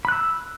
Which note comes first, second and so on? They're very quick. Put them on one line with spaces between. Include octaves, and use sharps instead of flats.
B5 F#6 E6